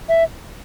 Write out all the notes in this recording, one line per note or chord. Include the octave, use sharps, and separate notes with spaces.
E5